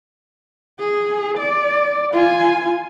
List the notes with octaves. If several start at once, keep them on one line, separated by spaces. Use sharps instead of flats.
G#4
D5
F4 G#5